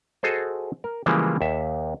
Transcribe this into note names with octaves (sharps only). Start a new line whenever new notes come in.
F#4 G#4 A4 C5 D#5
A#4
C#3 E3 F3 G3 G#3 A#3
D#2 E5